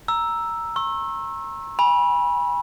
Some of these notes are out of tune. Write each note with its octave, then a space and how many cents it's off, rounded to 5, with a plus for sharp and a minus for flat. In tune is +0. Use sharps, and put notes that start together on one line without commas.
A#5 +0 E6 +0
C#6 -40 E6 +0
G#5 -25 B5 -25